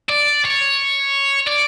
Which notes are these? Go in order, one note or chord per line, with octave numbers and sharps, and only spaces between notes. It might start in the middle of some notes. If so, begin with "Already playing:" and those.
D5
C#5
D5